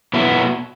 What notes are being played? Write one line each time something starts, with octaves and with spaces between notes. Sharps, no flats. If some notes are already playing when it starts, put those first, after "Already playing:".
B2 F#3 B3 E4